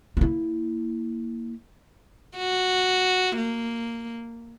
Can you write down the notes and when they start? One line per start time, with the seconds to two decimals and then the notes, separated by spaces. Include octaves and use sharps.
0.17 A#3 E4
2.36 F#4
3.37 A#3